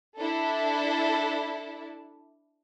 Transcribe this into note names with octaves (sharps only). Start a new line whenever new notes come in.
D4 E4 A4